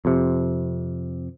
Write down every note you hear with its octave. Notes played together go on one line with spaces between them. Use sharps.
F2 C3